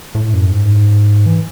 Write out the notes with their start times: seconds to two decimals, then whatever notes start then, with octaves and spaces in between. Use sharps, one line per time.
0.15 A2
0.33 F#2
0.52 G#2
1.26 E3